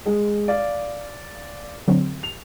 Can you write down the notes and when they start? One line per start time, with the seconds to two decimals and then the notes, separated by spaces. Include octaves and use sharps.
0.06 G#3
0.48 D5 F5
1.88 D3 F#3 C4
2.23 F7